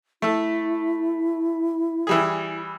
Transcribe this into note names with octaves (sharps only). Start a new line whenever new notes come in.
A3 E4 A4
E3 G3 G#4